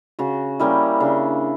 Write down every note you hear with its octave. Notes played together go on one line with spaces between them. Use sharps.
C#3 F#4
G3 A#3 C#4 E4
C#3 D4